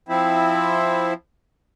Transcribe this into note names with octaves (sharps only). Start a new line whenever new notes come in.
F3 C4 E4